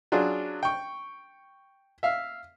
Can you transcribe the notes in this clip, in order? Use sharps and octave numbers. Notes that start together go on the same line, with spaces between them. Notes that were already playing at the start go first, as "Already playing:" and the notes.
F#3 D4 F4 F#4 G#4
G5 C#6
E5 F5